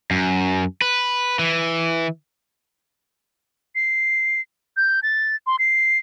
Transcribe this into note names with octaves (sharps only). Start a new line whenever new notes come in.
F#2
B4
E3
C7
G6
A6
C6
C7